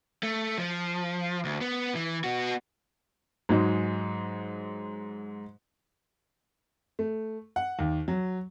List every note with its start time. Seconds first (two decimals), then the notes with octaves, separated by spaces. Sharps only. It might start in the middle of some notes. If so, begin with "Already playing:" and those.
0.23 A3
0.58 F3
1.45 D2
1.61 B3
1.95 E3
2.24 B3 F#4
3.49 G#2 F#3 G#3
6.99 A3
7.56 F#5
7.79 D#2
8.08 F#3